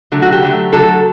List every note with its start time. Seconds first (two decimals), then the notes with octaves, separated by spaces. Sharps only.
0.12 D3 F#3 A3
0.22 F#4
0.32 G4
0.42 D3 F#3 A3
0.72 D3 F#3 A3 A4